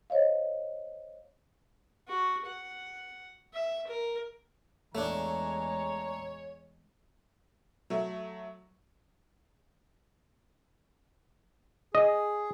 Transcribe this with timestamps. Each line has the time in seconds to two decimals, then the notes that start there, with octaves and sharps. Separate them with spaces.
0.10 C5 C#5 D#5 F5
2.08 F#4
2.46 F#5
3.53 E5
3.87 A#4
4.95 E2 G#3 A3 D4 C#5 A#5
7.90 F#3 A3
11.95 G#4 D#5